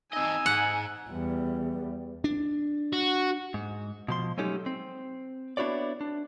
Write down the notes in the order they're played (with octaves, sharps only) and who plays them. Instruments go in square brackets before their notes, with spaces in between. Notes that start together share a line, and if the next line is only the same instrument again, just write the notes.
[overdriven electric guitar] C4 D#5 [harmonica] D#4 E6 [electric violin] G#5
[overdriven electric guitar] G#2 [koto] F#5
[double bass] E2 G3
[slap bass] D4
[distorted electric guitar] F#4
[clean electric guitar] G#2
B2 F3 C6
F#3 G#3 A3 C#4 D#4 G4
C4
B3 D4 E4 F#4 C#5 D5
D4